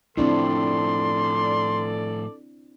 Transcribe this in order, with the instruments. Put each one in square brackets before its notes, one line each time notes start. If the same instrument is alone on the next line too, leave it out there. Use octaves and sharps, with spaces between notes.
[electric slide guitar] A2 F3 [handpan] C4 D4 E4 [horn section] A4 D5 [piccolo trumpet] C6